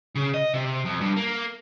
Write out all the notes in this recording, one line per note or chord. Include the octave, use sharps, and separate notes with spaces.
C#3
D#5
C3
F2
G2
A#3